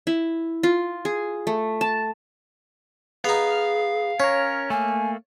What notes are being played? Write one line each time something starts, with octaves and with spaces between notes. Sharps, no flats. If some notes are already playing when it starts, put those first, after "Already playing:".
E4
F4
G#4
A3
A5
B3 D#4 G#4 F5
C#4 A#4 C#5
A3 A#3 G#5